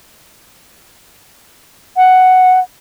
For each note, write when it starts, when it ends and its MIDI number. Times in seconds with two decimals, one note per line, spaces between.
1.97 2.59 78